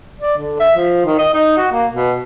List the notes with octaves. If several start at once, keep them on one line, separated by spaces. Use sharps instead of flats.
D5
D3
E5
F3
D#3
D#5
D#4
F#4
A#3
B2